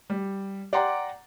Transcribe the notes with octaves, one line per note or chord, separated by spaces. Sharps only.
G3
D5 F#5 G5 A#5 C6 D6